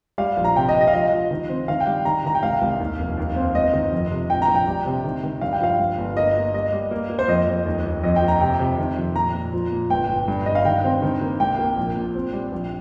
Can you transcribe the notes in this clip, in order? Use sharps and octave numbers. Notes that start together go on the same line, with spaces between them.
G3 F5
A#1
A#5
C3 G5
D#5
C3
D#5
F5
F3 D#5
F3
D#3
C4
D#3 F5
G5
G3
D#3 A#5
D#3 A#5
G5
C2 F5
C2
D#2
F1
D#2
C4
G1 D#5
D#3
F2
C3
A#1 G5
A#5
A#1
G5
G3
C3
D#3
D#3
G2 F5
G5
F3 F5
G2
G1
A#3 D#5
A#3
G3 D#5
G3
A#3
A#3
C5
F2 D#5
F2
D#2
D#2
F2 D#5
G5
F3
A#5
C3 G5
C3
D#3
F2
A#2 A#5
A#2
F3
A#2
G1 G5
G1
G2
G2 D#5
F5
D#3 G5
C4
D#3
A#3
C2 G5
A#3
A#1
A#2
C4
G3
A#1